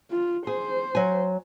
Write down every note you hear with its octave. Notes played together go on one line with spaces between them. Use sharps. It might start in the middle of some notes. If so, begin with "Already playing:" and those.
F4
G#4 C5
F#3 G#5